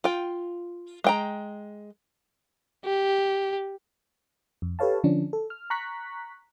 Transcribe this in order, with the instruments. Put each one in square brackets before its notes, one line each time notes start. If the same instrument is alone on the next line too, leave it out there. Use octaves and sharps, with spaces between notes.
[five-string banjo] F4 G5
G#3 G5 A#5
[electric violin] G4
[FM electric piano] F2
G4 A4 B4 C#5 F5 A5
D3 F3 C#4 D4
A4
F6
A#5 C#6 F#6 B6